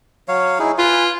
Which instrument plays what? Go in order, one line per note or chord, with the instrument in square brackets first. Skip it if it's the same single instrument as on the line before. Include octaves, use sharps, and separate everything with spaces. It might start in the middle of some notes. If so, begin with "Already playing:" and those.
[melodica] F#3 C#5 F5
D#4 E4 G#4
[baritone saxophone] F4 [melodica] B4 G#5